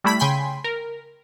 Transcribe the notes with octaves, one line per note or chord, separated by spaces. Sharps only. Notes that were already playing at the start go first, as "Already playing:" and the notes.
G3 A3 E4 B5 B6
C#3 G5 G#5 B5 C6 B6
A#4